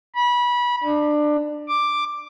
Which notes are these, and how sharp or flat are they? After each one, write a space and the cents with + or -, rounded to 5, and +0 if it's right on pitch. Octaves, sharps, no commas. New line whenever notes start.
B5 -25
D4 +20
D6 +5